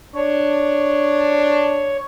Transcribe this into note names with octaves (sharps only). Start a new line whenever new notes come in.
D4 C#5